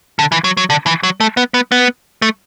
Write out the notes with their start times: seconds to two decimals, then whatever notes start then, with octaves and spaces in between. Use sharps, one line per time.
0.19 D3
0.32 E3
0.44 F#3
0.57 F#3
0.70 D3
0.86 E3
1.03 F#3
1.20 A3
1.37 B3
1.54 B3
1.72 B3
2.22 A3